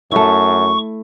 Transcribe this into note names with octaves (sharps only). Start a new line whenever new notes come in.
F#2 A3 E4 C#6